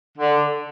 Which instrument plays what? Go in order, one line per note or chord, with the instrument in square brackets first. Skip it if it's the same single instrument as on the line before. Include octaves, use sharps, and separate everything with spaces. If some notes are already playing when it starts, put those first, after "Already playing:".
[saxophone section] D3